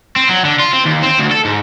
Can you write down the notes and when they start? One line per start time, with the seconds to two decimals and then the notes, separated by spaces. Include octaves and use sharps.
0.16 C4
0.29 F#3
0.45 D3
0.60 F4
0.73 C4
0.86 D#2
1.03 C4
1.19 D2
1.31 A4
1.45 G#2